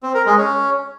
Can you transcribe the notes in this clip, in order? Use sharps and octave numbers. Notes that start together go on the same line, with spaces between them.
C4
A#4
G#3
C#4